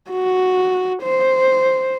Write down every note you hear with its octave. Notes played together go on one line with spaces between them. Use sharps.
F#4
C5